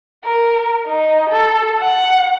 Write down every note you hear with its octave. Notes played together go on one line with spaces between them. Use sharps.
A#4
D#4
A4
F#5